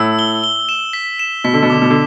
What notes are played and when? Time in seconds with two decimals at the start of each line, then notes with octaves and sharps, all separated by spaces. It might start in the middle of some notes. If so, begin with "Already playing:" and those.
Already playing: A2 E6
0.19 G7
0.44 G7
0.69 E7
0.93 B6
1.19 E7
1.44 B2 B6
1.54 D3
1.62 B2
1.70 D3 D6
1.82 B2
1.90 D3